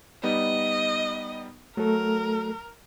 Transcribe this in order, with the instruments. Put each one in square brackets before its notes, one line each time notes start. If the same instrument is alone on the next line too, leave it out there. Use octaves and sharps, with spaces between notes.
[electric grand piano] G3 B3 D#4 [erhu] D#5
[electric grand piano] F#3 [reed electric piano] A3 A4 [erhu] A#4